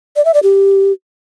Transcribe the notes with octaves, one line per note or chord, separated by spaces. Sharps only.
D5
E5
D5
G4